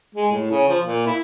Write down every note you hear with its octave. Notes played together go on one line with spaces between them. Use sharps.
G#3
A2
C#3
F3
A#2
E4